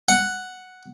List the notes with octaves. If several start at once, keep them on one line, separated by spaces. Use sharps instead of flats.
F#5